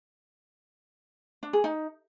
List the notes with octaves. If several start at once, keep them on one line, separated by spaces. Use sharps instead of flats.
D4
G#4
D#4